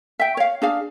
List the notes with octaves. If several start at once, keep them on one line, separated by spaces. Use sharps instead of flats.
E5 G5
C#5 F5
D4 G#4 F5